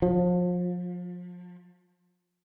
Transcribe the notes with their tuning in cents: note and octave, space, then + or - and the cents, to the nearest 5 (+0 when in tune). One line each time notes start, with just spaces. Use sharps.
F3 +30